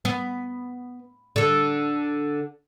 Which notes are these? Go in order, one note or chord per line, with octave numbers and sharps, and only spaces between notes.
B3
D3 A4